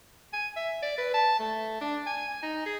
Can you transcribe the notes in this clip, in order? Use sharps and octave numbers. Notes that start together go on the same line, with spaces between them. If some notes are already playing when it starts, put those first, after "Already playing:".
G#5
E5
D5
B4
A5
A3
D4
G#5
D#4
G#4